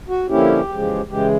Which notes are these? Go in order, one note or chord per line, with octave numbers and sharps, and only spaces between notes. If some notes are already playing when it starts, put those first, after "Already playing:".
F#4
D3 F3 A#3 C#4 E4 G4
E2 C#3 F3 G#3
C#3 E3 G#3 G4